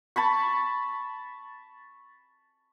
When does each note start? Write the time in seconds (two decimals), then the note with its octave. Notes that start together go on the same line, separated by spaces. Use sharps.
0.16 A5 B5 C#6